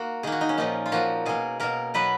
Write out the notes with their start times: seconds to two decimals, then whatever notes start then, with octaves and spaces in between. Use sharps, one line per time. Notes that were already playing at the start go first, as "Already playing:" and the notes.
Already playing: A#3 F#4
0.23 D#3 A#3 G#4
0.32 F#4
0.41 D#4
0.49 C#4
0.58 A#2 F3 A#3 D#4
0.86 F4
0.92 A#2 F3 A#3 F#4
1.26 B2 A#3 G#4
1.60 B2 A#3 A#4
1.94 B2 F#3 B3 B4